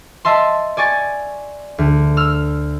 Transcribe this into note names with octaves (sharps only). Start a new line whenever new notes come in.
D#5 E5 A5 C6
D5 G#5 C#6 A6
D2
E6 F6